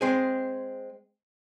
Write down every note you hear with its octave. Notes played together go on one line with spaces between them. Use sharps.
G#3 C4 G#4